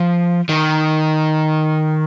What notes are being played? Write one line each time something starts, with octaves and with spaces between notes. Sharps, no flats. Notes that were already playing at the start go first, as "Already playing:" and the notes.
Already playing: F3
D#3